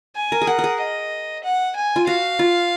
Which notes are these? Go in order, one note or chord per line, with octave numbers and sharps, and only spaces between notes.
G#5
A#4
G#4
A#4 F#5
A#4
G#4
D#5
F#5
G#5
F4
F#4 F5
F4